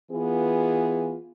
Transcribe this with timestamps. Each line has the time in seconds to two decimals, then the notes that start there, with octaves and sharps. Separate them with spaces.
0.11 E3 B3 F4 G#4